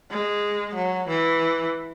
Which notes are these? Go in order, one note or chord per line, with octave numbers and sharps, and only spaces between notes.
G#3
F#3
E3